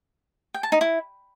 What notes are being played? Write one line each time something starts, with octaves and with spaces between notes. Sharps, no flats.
G5
A5
D#4
E4